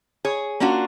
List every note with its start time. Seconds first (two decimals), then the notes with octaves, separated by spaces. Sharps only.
0.25 G#4 C#5
0.60 A#3 C#4 D4 F4 F#4